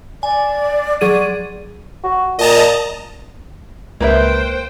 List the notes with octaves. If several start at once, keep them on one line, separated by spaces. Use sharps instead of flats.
D5 G#5
F#3 G#4 D5 D#7
F#4
A#2 D#5 A5 A#5
C#2 A#3 B4 C5 E5 G5